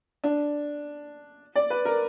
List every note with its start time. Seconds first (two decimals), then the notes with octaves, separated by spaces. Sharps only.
0.24 D4
1.55 D5
1.70 B4
1.85 A#4